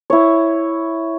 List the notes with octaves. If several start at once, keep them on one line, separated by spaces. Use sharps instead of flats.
E4 C#5